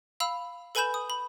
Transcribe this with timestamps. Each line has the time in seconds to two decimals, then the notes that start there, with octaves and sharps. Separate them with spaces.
0.20 F5 B5 E6 F7
0.75 A4 B4 G#5 B5 G6 E7
0.94 D#6
1.10 B5